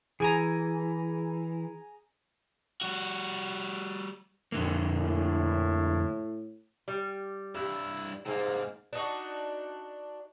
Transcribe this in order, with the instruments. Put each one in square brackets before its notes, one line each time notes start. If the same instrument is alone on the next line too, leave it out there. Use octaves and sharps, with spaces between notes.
[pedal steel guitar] E3 [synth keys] G#4 G#5 A#5
[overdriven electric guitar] G3 F#4
[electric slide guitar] F2 D3 A#3
[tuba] A2
[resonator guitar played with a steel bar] G3
[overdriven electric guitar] G2 E4 [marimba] G4
[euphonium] G#2 [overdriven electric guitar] C3 A#3
[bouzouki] D4 D#4 F#4